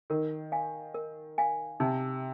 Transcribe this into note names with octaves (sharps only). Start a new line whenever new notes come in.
D#3 A#4
F5 G#5
A#4
F5 G#5
C3 D#4